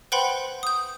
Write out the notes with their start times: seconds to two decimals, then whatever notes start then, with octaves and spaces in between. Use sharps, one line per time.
0.12 B4 C5 F#5 G5 B5 C6
0.63 D#6 G6